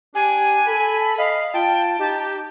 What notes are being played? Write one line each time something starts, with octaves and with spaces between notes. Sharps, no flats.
D4 G4 G#5
A4 B5
D#5 F5
F4 G5 A5
D#4 G4